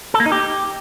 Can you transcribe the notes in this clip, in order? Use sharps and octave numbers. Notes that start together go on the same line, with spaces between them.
A4
A#3
D#4
G4